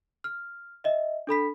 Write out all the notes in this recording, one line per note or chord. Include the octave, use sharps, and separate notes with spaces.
F6
D#5 E5
D4 A4 B5 B6